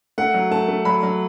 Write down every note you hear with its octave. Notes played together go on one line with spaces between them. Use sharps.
A3 F#5
F#3
A3 A5
A3
F#3 B5
F#3